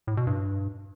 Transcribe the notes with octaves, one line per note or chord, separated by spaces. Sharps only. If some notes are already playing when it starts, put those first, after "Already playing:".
A2
B2
G2